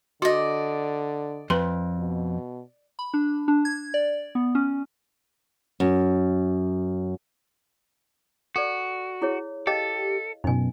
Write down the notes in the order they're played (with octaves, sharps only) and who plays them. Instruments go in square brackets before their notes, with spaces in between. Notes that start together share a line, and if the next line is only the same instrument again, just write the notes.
[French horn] D3 [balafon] F#4 [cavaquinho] D5 D#5
[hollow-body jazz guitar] F2 [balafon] B4 C6
[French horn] B2
[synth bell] B5
D4
D4
G#6
D5
B3
C#4
[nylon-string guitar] F#2
[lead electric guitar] F#4 [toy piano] A4 D5
[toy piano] E4 G#4 C#5
[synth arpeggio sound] G4 [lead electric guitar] A4 [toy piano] D#5 F5
[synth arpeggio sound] F#2 B2 [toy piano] D#4 G#5